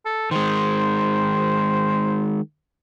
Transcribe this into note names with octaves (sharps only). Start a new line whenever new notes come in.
A4
D#3 G#3 C5